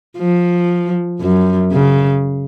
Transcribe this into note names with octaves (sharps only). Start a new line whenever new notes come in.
F3
F#2
C#3